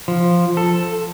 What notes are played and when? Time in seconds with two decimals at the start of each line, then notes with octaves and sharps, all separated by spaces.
0.08 F3
0.57 A4